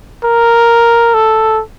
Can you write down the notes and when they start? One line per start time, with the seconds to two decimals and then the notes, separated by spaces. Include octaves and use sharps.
0.24 A#4
1.14 A4